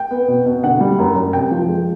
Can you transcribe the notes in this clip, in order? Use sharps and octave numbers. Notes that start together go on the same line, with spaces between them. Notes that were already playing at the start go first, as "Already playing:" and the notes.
Already playing: G5
B3
B2
B2
D3 F#5
G3
F#2
F#2
C3 G5
F3
G#3